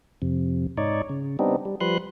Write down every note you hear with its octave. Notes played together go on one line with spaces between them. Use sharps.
F2 C3
G#2 D#4 C#5 D5
C#3
G3 B3 C4 D4 D#4
G3
F3 G3 B4 C6 F#6